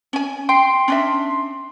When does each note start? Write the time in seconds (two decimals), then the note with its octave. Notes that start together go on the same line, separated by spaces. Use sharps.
0.13 C#4 G#5
0.49 G5 C6
0.88 C#4 D4 E5